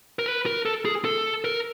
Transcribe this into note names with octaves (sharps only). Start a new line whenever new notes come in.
A#4
B4
A#4
A4
G#4
A4
A#4